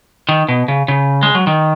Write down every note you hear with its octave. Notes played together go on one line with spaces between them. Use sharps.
D#3
B2
C#3
C#3
G#3
F#3
D#3